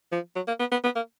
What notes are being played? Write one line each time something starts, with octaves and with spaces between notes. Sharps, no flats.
F3
F#3
A#3
B3
B3
B3
A#3